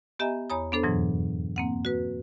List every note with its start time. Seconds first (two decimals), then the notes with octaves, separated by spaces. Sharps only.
0.19 B3 G4 D#5 E5 G#5 A#5
0.50 E2 C#5 A#5 B5 D#6
0.72 B3 D4 A4 C5
0.83 F2 G#2 B2 E3 F#3
1.56 A#3 C4 F#5
1.85 F#4 B4